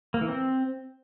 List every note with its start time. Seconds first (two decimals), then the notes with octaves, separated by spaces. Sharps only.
0.14 A#3
0.21 E3
0.28 C4